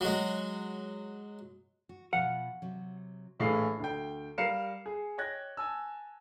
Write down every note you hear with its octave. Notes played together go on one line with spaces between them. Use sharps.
F#3 G#3
F#4
B2 F3 F5 F#5
C3 F#3
A#1 A2 E3 G#4 F5 C7
D2 G5
G3 A#4 F5 C7 C#7 E7
G#4
C#5 D#5 G5 F#6 G#6 A#6
G#5 A5 E6